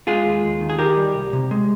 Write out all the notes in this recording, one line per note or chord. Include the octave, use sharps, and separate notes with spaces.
G#3 F4 G#4
D#2
D#2
D#3
G#4
D#3 G4 A#4
G3
C2
C3
G#3